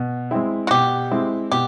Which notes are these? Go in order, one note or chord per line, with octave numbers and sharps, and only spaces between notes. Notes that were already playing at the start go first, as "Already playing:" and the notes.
Already playing: B2
G#3 C4 E4
F#4
B2 G4
G#3 C4 E4
B2 G4